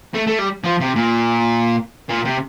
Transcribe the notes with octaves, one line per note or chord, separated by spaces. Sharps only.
A3
A3
G3
F3
C3
A#2
A#2
C3